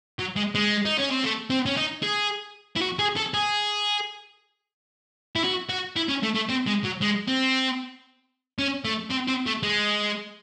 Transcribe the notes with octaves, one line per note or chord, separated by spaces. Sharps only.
F#3
G#3
G#3
D#4
C#4
C4
A3
C4
C#4
D#4
G#4
E4
F#4
G#4
A4
G#4
E4
F#4
F#4
E4
C#4
A3
A3
C4
G#3
F#3
G#3
C4
C#4
A3
C4
C4
A3
G#3